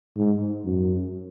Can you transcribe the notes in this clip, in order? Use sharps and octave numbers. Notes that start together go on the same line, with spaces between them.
G#2
F#2